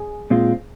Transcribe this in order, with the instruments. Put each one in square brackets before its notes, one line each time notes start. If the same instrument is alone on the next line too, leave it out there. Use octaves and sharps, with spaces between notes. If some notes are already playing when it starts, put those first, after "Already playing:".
Already playing: [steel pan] G#4
[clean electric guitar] A#2 G#3 C4 F4